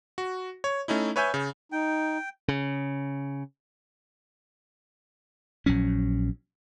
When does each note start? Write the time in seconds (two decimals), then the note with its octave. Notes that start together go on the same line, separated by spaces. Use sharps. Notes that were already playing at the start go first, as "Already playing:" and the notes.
0.18 F#4
0.64 C#5
0.88 A3 C#4 D#4 E4
1.16 B4 C#5 E5 G#5 G6
1.34 C#3
1.72 D#4 G5
2.48 C#3
5.66 A#1 F#3 C#4